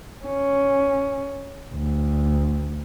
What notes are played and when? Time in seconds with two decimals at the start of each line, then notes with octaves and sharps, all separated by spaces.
0.25 C#4
1.74 D2